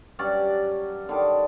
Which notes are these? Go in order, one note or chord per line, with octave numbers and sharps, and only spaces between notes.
G2 F#3 C#4 D5
D3 D#3 D6